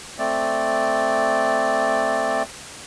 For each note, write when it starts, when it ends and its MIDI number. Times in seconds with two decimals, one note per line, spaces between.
0.19 2.43 57
0.19 2.43 60
0.19 2.43 74